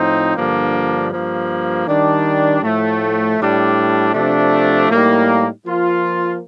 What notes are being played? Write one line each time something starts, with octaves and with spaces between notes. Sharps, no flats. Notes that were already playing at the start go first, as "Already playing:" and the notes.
Already playing: A2 F3 C4 D#4
G2 D3 F3 A#3 D4
G2 F3 A#3
D#3 G3 D4
A2 F3 A3
A2 G3 D4
C3 F3 A3 D4
A2 G3 A#3 D#4
F3 A#3 F4